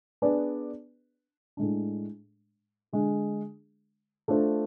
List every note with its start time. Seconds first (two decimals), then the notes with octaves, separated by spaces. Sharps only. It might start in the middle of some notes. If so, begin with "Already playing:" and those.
0.22 B3 D4 G#4 B4 D5
1.57 A2 G#3 D4
2.93 D3 G#3 D4 G#4
4.28 A3 D4 F4 A4 C5